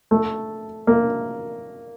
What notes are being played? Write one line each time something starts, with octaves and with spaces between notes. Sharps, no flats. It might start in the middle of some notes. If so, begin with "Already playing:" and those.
A3
A#3